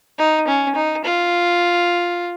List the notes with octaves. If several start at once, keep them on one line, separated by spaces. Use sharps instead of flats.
D#4
C#4
D#4
F4